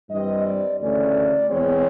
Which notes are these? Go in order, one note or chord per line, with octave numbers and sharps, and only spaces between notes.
G2 E3 G3 C4 D#5
D5
D2 C#3 E3 A3 C#4 D5
E2 B2 G#3 C4 C#5